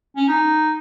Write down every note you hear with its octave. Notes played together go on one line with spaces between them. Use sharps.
C#4
D#4